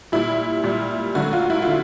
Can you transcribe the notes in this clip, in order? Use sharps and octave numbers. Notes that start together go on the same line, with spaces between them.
A#2 G3 E4
A#2 G3
D3 F#3 A3 F#4
F4
E4
F4
D3